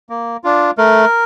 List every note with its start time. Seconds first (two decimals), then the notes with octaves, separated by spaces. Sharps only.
0.09 A#3
0.44 D4 F4
0.78 A3 A#4